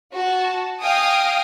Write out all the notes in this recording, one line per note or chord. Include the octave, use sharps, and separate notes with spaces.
F#4 A5
D#5 F5 G5 G#5 D#6